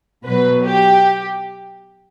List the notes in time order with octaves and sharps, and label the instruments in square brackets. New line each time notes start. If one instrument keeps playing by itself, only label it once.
[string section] B2 F#3 B4
G4